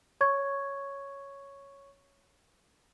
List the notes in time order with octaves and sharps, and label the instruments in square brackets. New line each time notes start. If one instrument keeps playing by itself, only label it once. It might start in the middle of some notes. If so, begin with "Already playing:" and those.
[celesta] C#5 C#6 G#6